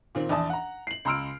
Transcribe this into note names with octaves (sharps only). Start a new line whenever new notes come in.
A#2 D#3 C4
A#1 E2 D5 A5 D#6
F#5 A#5
C7 F#7
C#2 A#5 C6 E6 F6 D7